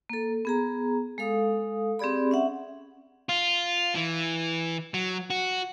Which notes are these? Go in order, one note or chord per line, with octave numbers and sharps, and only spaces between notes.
A#3 A4
B3 G#4 A#5
G#3 A4 F5 D#6
C4 G4 G#4 D5 B5
C#4 E5 F#5
F4
E3
F#3
F#4